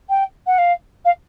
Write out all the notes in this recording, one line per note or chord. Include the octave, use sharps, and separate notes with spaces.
G5
F#5
F5
F5